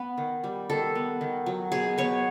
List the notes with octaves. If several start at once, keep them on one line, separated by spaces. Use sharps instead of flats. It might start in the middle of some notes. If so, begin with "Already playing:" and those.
Already playing: B3 B4
D#3
G3
D#3 A4
B3
D#3
F#3
B2 G#4
B3 C#5